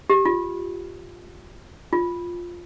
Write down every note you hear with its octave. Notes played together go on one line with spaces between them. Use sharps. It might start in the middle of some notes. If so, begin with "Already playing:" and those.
G4
F4
F4